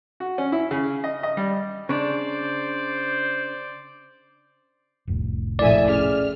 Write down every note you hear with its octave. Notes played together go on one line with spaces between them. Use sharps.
F#4
C#4
E4
C#3
D#5
D#5
G3
C#3 D4 C5 D5
F1 C2 A2
A#1 A3 E4 A4 D5 E5 G#5
C#4 G#4 F6